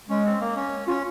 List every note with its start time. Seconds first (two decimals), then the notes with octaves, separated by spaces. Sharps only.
0.09 G#3 C#4
0.25 C4
0.40 A#3
0.56 C#4
0.88 C#4 F4